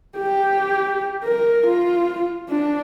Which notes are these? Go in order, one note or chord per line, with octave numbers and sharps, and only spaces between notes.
G4
A#4
F4
D4